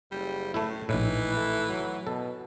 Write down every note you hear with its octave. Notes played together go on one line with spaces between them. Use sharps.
F#1 G3
A2 A3 E4
A#1 A2 E3 D#4
A3
F#3
B2 A4